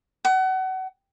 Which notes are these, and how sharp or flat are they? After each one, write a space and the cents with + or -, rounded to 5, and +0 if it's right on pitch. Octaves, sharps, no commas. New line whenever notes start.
F#5 +30